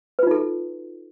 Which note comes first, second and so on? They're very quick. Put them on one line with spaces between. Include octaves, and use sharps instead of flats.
B4 F4 D#4 A4 F#4